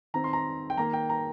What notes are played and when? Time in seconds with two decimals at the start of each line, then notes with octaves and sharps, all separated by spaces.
0.14 D#3 C4 A#5
0.24 C6
0.33 A#5
0.70 G5
0.77 D#3 A#3 A#5
0.93 G5
1.10 A#5